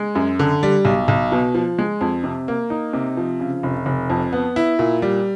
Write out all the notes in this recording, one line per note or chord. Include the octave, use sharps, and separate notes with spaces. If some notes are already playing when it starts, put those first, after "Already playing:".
Already playing: G#3
F#2
D3
G3
B1
B1
B2
F3
G#3
F2
C3
A#3
D#4
C3
F3
C#3
F1
F1
F2
B3
E4
A#2
G3